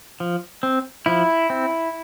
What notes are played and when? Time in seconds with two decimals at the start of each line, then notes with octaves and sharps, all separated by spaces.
0.20 F3
0.63 C4
1.06 F3 E4
1.50 C4